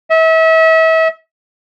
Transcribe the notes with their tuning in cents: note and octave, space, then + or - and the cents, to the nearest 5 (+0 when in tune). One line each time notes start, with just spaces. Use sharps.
E5 -35